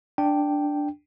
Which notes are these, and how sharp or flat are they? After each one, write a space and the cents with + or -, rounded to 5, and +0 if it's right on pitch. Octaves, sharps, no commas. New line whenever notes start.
D4 +0 G5 +0